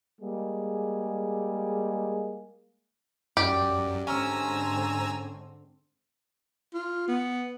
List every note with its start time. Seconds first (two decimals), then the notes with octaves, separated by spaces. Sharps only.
0.21 G3 G#3 A#3 G#4
3.37 F#2 G4 D5
4.07 G#2 D3 C4 C#4 G#5 A#5 E6
6.74 F4
7.08 B3